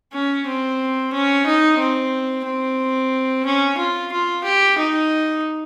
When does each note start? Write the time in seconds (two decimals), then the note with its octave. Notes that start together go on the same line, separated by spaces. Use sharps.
0.13 C#4
0.46 C4
1.13 C#4
1.46 D#4
1.79 C4
2.45 C4
3.45 C#4
3.78 F4
4.12 F4
4.44 G4
4.78 D#4